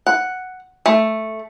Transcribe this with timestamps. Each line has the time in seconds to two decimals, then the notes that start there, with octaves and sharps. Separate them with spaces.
0.07 F#5
0.86 A3